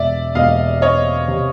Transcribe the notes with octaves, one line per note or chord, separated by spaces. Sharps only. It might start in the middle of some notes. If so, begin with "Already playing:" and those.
Already playing: E1 D5 E5
E1 D#5 F5
C4 C#5 D#5
C3